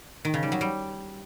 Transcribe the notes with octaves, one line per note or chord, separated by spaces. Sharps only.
D#3
C#3
G3
F#3
G3